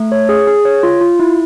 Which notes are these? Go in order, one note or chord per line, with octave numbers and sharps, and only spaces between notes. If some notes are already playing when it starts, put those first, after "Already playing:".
Already playing: A3
C#5
G#4
G#4
C#5
F4
F4
E4